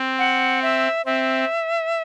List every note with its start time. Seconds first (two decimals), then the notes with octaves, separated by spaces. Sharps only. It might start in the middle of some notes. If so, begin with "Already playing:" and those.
Already playing: C4
0.19 F#5
0.62 E5
1.06 C4 E5